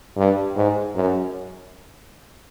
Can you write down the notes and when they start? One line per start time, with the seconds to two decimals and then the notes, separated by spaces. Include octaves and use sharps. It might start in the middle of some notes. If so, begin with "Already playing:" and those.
0.17 G2
0.56 G#2
0.96 F#2